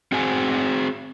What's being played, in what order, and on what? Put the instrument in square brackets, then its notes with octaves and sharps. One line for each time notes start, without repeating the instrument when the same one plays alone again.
[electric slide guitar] C4 F#4 G#4 C5 G#5